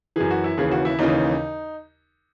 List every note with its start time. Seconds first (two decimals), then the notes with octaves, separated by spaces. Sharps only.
0.16 F#2 E3 G#4
0.31 F#4
0.44 E4
0.58 D#2 C#3 E3 G#4
0.71 F#4
0.85 E4
0.99 D#2 C#3 E3 D#4